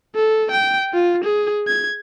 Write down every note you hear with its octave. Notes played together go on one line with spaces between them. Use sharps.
A4
G5
F4
G#4
G#6